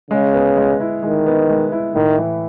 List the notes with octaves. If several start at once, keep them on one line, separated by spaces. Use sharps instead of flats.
C#3 G#3
B3
G#3
E4
D#3 G#3
B3
G#3
E4
A2 D#3
E3